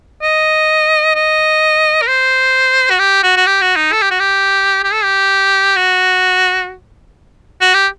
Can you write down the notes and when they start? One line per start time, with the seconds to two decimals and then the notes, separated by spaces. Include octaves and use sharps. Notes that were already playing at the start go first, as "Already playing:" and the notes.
0.22 D#5
1.15 D#5
2.02 A#4
2.08 C5
2.90 F#4
2.99 G4
3.23 F#4
3.37 F#4
3.46 G4
3.62 F#4
3.76 D#4
3.92 A4
4.02 G4
4.11 F#4
4.20 G4
4.84 G4
4.93 A4
5.04 G4
5.76 F#4
7.61 F#4
7.74 G4